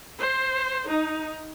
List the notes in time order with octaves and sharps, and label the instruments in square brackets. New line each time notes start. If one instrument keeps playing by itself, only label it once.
[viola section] C5
D#4